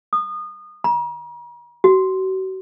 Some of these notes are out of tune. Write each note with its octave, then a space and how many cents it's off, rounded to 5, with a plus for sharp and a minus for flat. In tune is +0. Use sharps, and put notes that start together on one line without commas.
D#6 -25
A#5 +45
F#4 +40